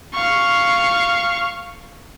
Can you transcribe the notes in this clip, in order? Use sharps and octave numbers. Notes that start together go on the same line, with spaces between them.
F5 C#6